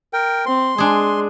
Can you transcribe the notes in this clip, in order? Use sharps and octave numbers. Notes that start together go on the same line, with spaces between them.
A#4 G5
C4 C6
G#3 D4 G#4